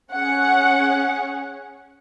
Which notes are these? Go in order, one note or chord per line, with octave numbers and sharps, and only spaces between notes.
C#4 G#4 F#5